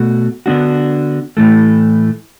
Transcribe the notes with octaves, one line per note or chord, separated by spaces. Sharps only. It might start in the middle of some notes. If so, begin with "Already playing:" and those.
Already playing: B2 A3 F#4
D3 B3 D4 F#4
A2 E3 A3